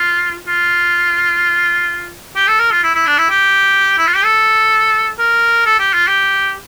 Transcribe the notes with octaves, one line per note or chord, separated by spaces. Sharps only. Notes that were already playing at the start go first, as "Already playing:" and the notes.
Already playing: F4
F4
G4
A4
A#4
F4
E4
E4
D4
E4
G4
E4
F4
G4
A4
A#4
A4
G4
F4
G4